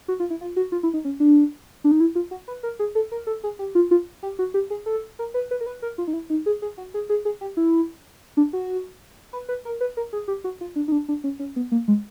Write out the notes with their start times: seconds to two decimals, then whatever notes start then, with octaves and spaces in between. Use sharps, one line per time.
0.08 F#4
0.20 F4
0.30 E4
0.41 F4
0.56 F#4
0.72 F4
0.83 E4
0.94 D#4
1.05 C#4
1.20 D4
1.84 D4
1.91 D#4
2.00 E4
2.15 F4
2.31 F#4
2.48 B4
2.63 A#4
2.79 G#4
2.95 A4
3.12 A#4
3.27 A4
3.44 G#4
3.59 G4
3.75 F4
3.91 F4
4.23 G4
4.39 F#4
4.54 G4
4.70 G#4
4.86 A4
5.19 A#4
5.34 B4
5.51 B4
5.61 A#4
5.66 B4
5.82 A#4
5.98 F4
6.08 D#4
6.13 E4
6.30 D#4
6.46 G#4
6.62 G#4
6.78 F#4
6.94 G#4
7.09 G#4
7.25 G#4
7.41 G4
7.57 E4
8.37 D4
8.53 F#4
9.33 B4
9.49 B4
9.65 A#4
9.81 B4
9.97 A#4
10.13 G#4
10.28 G4
10.44 F#4
10.61 F4
10.76 D4
10.88 D#4
10.92 D4
11.08 D4
11.24 C#4
11.39 C#4
11.56 B3
11.72 A#3
11.88 G#3